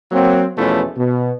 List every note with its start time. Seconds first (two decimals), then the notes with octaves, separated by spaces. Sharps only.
0.12 F#3 A#3 C4
0.57 E2 B2 F3 A3 C#4 E4
0.97 B2